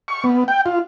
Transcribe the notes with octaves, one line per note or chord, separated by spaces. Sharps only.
C#6
B3
G5
F4